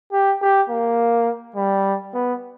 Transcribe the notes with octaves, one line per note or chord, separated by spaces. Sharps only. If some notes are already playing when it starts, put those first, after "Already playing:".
G4
G4
A#3
G3
B3